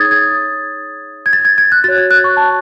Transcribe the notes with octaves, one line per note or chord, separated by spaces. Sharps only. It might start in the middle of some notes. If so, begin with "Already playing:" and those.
Already playing: D#4 G#4 C#5 D#6 G#6 A6
G#6
G#6
A6
G#6
G#6
F#6
F#4 C#5 A6
G#6
F#6
C#6
A5